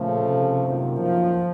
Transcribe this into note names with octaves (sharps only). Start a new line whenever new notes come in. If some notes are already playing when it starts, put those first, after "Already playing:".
Already playing: A#2 C#3 F3 A3
C3
F#2 D#3 A#3 F4
F3